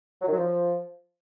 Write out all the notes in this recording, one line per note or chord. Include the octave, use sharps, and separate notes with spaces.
F#3
D#3
F#3
F3